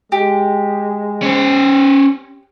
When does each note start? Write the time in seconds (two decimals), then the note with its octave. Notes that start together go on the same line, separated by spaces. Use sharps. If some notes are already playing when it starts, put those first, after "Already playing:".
0.12 G#3 G4
1.22 C#4 C5